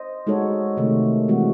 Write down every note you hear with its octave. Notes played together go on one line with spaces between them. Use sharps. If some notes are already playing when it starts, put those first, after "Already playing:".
Already playing: C5 D#5
G#3 D#4 F#4 A4 C#5
C3 D#3 A3
E3 G#3 C4 F#4